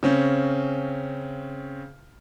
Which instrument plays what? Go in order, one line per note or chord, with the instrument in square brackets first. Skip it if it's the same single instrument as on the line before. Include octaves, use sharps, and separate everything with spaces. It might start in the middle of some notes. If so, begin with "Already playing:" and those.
[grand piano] C#3 C4 C#4